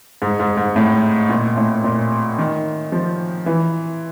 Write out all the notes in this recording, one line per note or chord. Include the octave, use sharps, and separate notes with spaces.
G#2
G#2
G#2
A2
A#2
A2
A#2
D#3
F3
E3